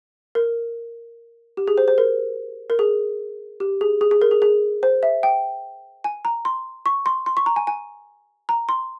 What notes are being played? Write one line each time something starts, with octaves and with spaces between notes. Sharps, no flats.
A#4
G4
G#4
C5
C5
A#4
A#4
G#4
G4
G#4
G#4
G#4
A#4
G#4
G#4
C5
E5
G5
G#5
A#5
C6
C#6
C6
C6
C#6
A#5
G#5
G#5
A#5
C6